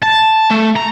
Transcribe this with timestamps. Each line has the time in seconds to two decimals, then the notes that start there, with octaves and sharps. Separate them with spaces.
0.02 A5
0.50 A3
0.76 A#5